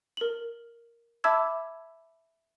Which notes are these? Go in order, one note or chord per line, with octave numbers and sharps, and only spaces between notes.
A#4 F#7
E5 A5 B5 D6 E6 G#6